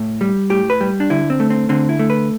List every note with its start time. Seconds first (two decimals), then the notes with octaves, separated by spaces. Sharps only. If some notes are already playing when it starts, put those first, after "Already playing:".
Already playing: A2
0.21 G3
0.50 A2 G4
0.70 B4
0.81 G3
1.00 D4
1.10 D3 E4
1.30 C4
1.40 A3
1.50 C4
1.69 D3 C4
1.89 E4
1.99 A3
2.10 B4